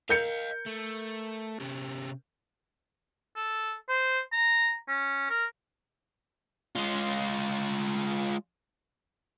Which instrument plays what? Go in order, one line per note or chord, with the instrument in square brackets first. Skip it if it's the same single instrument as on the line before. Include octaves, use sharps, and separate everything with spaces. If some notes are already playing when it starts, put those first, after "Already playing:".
[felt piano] A#4 G6 C#7 [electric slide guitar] D#5 F5
[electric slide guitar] A3
C3 C#4 G4
[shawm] A4
C5
A#5
C#4
A#4
[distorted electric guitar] G#3 F4